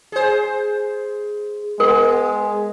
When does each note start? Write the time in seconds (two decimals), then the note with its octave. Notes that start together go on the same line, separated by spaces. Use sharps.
0.12 G#4 C5
1.80 G#3 B3 A#4